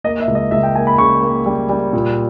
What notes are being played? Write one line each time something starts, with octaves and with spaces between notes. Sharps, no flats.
A#3 D#5
E5
C#2
D#5
C#2 E5
G5
A#3 G#5
B5
C#3 C#6
A#3
G3
G3
A#2